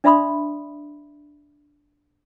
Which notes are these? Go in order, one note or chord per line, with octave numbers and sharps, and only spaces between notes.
D4 D5 E5 B5 C6 D#6